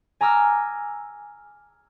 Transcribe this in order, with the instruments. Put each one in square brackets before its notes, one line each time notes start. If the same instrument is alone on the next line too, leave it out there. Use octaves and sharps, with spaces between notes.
[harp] G#5 A#5 D6 E6 F6 A#6